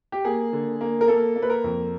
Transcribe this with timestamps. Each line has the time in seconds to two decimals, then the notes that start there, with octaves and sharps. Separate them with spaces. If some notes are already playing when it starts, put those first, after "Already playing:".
0.12 G4
0.25 A#3 G#4
0.53 D3
0.81 A#3
1.01 A#4
1.08 A#3 A4
1.36 A#3
1.42 B4
1.50 A#4
1.64 F2